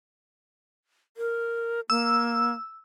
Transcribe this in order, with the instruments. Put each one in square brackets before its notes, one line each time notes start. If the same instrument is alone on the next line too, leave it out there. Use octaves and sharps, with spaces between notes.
[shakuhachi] A#4
[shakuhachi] A#3 [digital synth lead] E6